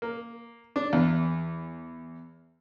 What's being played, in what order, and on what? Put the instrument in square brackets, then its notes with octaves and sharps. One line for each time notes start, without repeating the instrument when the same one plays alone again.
[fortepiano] A#3
D4
E2